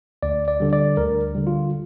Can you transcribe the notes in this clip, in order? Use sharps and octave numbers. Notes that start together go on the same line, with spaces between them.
D2 D5
D5
D3 G3
D5
D2 A#4
D3 G3
F4